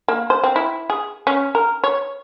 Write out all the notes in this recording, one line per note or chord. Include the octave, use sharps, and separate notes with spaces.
A#3
C5
C4
E4
G#4
C#4
A#4
C#5